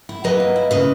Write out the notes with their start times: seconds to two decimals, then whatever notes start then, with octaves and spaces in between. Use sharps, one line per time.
0.09 E4
0.24 F#3 B4 D#5
0.40 A#3
0.56 E4
0.71 C#3 B4 D#5